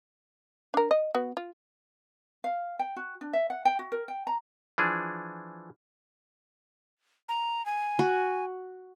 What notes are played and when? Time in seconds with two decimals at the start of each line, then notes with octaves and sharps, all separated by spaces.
0.74 D4 A#4
0.91 D#5
1.15 B3 F#4
1.37 F4
2.44 F5
2.79 G5
2.96 F#4
3.21 D4
3.33 E5
3.50 F#5
3.65 G5
3.79 F#4
3.92 A#4
4.08 G5
4.27 A#5
4.78 E3 F3 D4 G#4
7.29 A#5
7.66 G#5
7.99 F#4